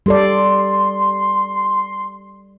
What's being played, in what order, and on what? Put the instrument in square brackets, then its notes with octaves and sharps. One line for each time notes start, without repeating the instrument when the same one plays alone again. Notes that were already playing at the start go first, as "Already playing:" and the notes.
[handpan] G3 A4 D5 [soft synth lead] C6